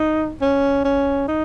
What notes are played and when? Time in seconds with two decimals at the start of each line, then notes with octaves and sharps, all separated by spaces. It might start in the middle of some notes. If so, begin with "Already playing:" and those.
Already playing: D#4
0.42 C#4
0.84 C#4
1.28 D#4